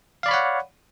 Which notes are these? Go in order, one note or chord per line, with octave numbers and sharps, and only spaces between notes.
C#5 D5 F5 F#5 B5